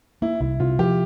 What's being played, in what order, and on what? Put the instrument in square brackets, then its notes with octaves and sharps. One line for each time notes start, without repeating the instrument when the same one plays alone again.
[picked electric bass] A#3 [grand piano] E4
[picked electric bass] C2 [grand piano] E4
[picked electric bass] C3 [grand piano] F4
[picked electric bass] F3 [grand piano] G4